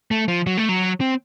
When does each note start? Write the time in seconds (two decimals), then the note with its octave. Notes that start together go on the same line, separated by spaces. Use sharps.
0.11 A3
0.28 F3
0.47 F#3
0.57 A3
0.69 F#3
1.01 C4